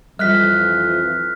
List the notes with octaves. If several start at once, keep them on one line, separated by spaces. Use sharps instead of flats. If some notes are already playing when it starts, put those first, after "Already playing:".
F2 E3 F3 G3 F6 F#6 B6